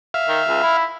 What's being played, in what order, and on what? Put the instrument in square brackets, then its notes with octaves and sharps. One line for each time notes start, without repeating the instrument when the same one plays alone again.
[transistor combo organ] E5 F5
[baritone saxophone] D#3
C#2
E4